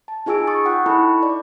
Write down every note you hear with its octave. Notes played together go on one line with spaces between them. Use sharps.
A5
D#4 F4 G#4 G#5 E6 D7
C#6 D#6 A6
F#5 G5 C#6 F#6
D#4 E4 A4 A5 B5 C#6
D5